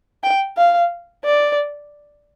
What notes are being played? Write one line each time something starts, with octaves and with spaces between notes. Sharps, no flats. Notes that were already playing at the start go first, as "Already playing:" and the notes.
G5
F5
D5